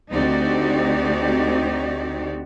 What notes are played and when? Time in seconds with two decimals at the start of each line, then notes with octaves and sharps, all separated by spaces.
0.12 D2 C4 D#4 F#4 G4 D5